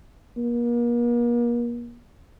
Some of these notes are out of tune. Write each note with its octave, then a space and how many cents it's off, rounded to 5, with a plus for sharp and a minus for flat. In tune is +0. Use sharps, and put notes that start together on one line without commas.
A#3 +40